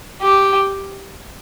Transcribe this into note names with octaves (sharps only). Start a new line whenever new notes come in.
G4